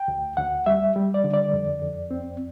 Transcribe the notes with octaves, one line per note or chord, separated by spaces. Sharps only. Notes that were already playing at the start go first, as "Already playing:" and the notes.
Already playing: G5
D2
D2 F#5
G3 E5
G3
D5
D3
D5
F2
F2
C4